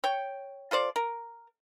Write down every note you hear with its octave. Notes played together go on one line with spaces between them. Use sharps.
C#5 G5
F4 A4 C5 D5
A#4